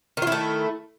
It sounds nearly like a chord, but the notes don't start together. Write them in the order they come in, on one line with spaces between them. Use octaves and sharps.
D#3 F4 E4 A3